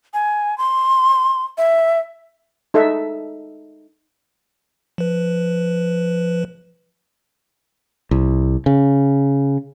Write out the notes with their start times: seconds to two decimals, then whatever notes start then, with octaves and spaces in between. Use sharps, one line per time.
0.14 G#5
0.58 C6
1.58 E5
2.74 D#4 A4 D#5 E5
4.98 F3 B4
8.11 C2
8.66 C#3